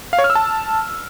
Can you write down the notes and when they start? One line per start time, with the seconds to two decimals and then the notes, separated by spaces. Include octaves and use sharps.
0.13 F5
0.19 C#5
0.24 F6
0.30 E6
0.35 A5